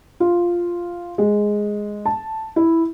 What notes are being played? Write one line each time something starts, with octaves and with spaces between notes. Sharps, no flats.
F4
G#3
A5
E4